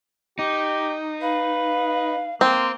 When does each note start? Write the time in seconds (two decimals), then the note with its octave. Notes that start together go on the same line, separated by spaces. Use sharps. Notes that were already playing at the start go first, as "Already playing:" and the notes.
0.39 D#4 G4
1.21 B4 F5
2.41 A#3 C4 C6